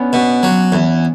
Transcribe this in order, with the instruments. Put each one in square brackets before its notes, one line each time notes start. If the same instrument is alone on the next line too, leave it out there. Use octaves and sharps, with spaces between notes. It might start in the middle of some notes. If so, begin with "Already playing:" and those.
Already playing: [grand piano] B3 C#4 D4
[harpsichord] B2
F#3
E2